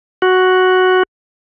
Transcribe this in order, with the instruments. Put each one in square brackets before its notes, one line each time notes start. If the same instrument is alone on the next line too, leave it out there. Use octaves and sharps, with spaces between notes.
[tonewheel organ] F#4